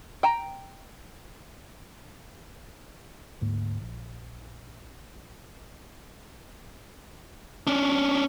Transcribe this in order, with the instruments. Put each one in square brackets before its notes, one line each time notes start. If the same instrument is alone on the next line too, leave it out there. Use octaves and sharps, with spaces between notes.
[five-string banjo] G5 A#5
[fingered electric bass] D2 G#2 A#3
A#1
[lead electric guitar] C#4 D4